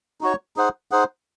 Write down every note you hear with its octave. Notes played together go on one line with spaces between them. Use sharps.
D#4 F#4 C#5
D#4 G#4 C5 F#5
D#4 G#4 C5 F#5